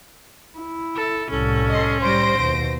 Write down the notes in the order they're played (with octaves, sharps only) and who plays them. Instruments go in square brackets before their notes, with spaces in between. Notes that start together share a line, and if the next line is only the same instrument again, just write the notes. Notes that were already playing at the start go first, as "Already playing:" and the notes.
[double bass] E4
[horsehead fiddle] A4
[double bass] C2 A2 [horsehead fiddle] C#4 [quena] A4
[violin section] D#5 C6
[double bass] A2 G3 [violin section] C5 A#6 D7 [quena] C6
[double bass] D#2 B2